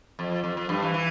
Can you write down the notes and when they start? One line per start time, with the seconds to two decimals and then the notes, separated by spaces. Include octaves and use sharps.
0.19 F2
0.44 F2
0.57 F2
0.69 G2
0.82 E3
0.94 E3